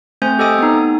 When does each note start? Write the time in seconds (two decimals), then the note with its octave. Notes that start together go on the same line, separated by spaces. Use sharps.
0.22 A3 C4 C5 G#5 G6
0.39 G4 A4 D#5 G5 G#5 D#6
0.59 B3 D#4